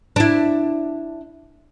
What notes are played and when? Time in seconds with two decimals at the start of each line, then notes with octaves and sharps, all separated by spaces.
0.16 D4 E4